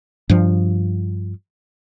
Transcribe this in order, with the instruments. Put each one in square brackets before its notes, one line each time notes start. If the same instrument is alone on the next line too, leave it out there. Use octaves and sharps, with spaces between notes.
[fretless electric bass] G2 F3